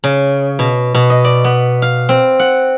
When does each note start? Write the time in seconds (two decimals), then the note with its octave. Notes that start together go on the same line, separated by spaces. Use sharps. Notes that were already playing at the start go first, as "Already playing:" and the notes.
0.04 C#3
0.59 B2
0.95 B2
1.10 D#5
1.24 D5
1.44 B3
1.82 F5
2.09 C4
2.39 F#5